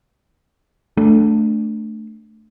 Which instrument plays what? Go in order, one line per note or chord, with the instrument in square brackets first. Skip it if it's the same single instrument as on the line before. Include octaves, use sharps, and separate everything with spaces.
[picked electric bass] A3 D4